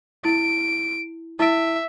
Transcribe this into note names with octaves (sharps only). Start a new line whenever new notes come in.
E4 D7
E4 E5 D7